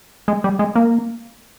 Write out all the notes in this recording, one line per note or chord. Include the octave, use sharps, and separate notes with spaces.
G#3
G3
G#3
A#3